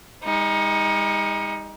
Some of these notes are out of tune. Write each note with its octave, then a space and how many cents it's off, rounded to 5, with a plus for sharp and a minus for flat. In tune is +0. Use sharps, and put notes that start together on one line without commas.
G#3 -45 D#4 +25